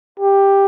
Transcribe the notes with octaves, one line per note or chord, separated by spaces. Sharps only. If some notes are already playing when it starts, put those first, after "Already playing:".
G4